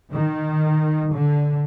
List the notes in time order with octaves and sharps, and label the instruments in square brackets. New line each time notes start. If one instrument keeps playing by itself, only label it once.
[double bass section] D#3
D3